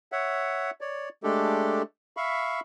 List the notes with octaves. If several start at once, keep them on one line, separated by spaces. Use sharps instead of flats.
C#5 E5 F#5
C#5 D5
G#3 A3 D4 G4 A4
E5 F5 B5 C#6